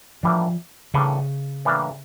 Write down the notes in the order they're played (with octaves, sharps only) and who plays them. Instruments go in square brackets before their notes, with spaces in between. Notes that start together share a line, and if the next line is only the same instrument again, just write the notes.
[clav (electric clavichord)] A2 E3 G3 A#3 D4 [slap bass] F3
[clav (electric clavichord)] A2 E3 G3 A#3 D4 [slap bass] C#3
[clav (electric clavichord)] A2 E3 G3 A#3 D4